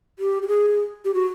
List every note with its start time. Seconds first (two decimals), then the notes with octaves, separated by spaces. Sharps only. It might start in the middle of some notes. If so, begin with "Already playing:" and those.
0.19 G4
0.42 G4
0.48 G#4
1.05 G4
1.14 F#4